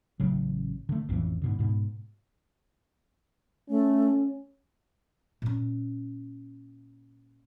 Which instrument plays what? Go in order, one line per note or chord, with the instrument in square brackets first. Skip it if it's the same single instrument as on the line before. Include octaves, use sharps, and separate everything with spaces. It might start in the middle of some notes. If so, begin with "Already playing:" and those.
[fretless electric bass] A1 C#3 F#3
D3 A3
A1 F2 A2 E3
G#2 B2 D3
G#2 B2
[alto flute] A3 [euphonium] C#4
[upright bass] A#2 C#4